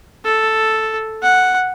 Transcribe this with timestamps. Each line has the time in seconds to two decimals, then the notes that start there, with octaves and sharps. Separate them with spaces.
0.25 A4
1.22 F#5